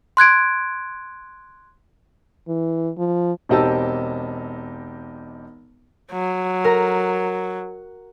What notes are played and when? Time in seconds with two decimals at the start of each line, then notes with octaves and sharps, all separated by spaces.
0.17 C6 F#6 G#6 D7
2.48 E3
2.98 F3
3.49 E1 C4 D#4 G4 A5 E6
6.12 F#3
6.64 A#4 A#5